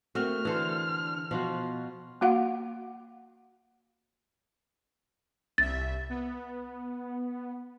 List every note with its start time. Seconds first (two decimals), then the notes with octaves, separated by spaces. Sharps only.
0.15 A3 A#3 C4 F#4 F6
0.45 D3 E3 D4 A4 C5
1.31 B2 F3 F4 F#4
2.21 A#3 F#4 F5 F#5
5.58 C2 E5 A6
6.09 B3